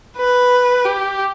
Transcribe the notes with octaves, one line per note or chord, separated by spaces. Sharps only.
B4
G4